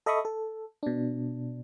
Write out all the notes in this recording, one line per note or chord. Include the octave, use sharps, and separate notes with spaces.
A4 D#5 E5 B5 C#6 D#6
A4
B2 D4